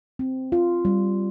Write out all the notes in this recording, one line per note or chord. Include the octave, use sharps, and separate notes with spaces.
C4
F4
G3